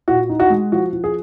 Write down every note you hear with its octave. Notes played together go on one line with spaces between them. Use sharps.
A#2 F#4
D#4
F#4
G#3
F3 F#4
F3
G#4